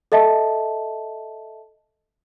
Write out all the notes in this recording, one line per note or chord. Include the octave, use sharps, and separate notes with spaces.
A4 D#5 E5 A5